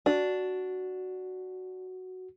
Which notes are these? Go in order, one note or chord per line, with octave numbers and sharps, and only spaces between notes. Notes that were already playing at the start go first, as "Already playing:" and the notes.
D4 F#4